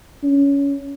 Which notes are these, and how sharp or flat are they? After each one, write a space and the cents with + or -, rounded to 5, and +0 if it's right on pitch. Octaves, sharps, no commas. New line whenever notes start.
C#4 +20